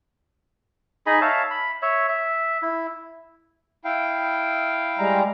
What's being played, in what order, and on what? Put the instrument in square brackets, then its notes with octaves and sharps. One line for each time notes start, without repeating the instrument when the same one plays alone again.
[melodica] D#4 G#4 D#5 B5
C#5 E5 F5 A5
B5
C#5 E5
E5
E4
[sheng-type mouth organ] E4 F5 G5
[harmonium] G3 G#3 A#5